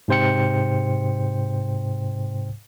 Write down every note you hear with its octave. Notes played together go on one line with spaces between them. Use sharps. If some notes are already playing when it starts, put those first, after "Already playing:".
G#2 C3 C5 G5 C#7